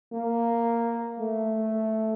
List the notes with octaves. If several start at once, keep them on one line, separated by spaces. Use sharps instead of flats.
A#3
A3